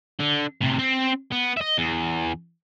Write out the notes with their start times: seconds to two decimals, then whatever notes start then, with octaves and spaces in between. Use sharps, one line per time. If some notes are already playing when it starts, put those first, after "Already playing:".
0.20 D3
0.61 A2 C3
0.79 C4
1.32 B3
1.57 D#5 E5
1.78 E2